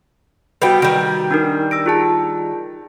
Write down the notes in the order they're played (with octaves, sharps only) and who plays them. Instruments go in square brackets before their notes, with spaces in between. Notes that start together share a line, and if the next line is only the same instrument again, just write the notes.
[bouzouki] G3 B3 G5 [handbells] F#4 B4
[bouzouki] D#3 G3
[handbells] D4 D#4 A#4
E6 A#6 D7
F4 G#4 A5